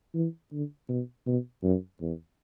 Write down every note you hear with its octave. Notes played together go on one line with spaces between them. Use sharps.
E3
D3
B2
B2
F#2
E2